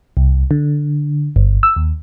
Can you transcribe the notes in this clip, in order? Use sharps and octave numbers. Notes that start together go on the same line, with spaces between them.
C2
D3
G1
E6
D#2